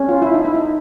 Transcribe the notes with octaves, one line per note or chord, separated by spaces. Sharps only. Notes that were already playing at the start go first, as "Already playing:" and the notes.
Already playing: C#4
F4
E4
D#4
E4
D#4